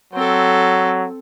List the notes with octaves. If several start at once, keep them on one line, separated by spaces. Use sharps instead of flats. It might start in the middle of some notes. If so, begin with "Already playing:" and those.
F#3 C4 A4